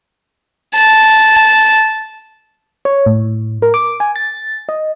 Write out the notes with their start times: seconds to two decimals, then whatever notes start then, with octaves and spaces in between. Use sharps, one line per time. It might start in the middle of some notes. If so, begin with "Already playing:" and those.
0.74 A5
2.85 C#5
3.06 A2
3.62 A#4
3.74 D6
4.00 G#5
4.16 A6
4.69 D#5